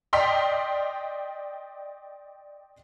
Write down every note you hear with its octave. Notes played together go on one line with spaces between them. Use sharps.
D5 D#5 G5 C6 F6 B6